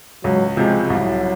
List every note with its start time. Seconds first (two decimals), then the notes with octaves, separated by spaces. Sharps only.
0.23 C#2 F#3
0.57 C3 F3 G#3
0.90 C2 F#3